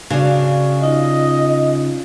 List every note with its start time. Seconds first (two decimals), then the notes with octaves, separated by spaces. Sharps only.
0.10 C#3 D4 F#4 F5 C#6
0.81 D#4 F4 D#5